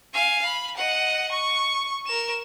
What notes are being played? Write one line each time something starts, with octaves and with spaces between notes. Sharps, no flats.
F5 G#5
B5
D#5 F#5
C#6
A#4 E7